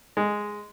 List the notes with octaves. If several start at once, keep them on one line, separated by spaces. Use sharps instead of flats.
G#3